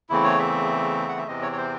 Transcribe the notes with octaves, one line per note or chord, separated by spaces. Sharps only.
E2 C#3 E3 A3 C4 E4
C#5
E5
F#5
E5
E2 C3 E3 C4 D#5
C#5
C#5
C5